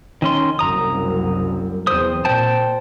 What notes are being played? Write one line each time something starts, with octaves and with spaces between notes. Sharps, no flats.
D#3 C#4 C6
F#1 C2 F#2 A#5 D#6
E2 C4 C5 D#6
A#2 C5 G5 A5